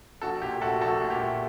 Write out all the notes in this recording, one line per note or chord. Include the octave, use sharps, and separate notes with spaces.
A#1 F#4 A4
A#2 G4
A3 F#4 A4
A#1 F#4 A4
A#2
G4
A3